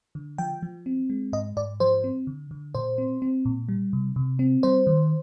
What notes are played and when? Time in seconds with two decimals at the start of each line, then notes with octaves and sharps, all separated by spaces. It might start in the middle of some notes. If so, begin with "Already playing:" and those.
0.15 D3
0.38 F3 G5
0.63 F3
0.86 C4
1.10 G#3
1.33 G#2 D#5
1.57 G#2 D5
1.80 F3 C5
2.04 C4
2.27 D3
2.51 D3
2.75 A#2 C5
2.98 C4
3.22 C4
3.45 A#2
3.69 G3
3.93 C3
4.16 C3
4.39 C4
4.63 G3 C5
4.87 D#3